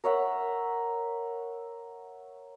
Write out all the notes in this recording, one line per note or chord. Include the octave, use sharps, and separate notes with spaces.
A#4 C#5 E5 F#5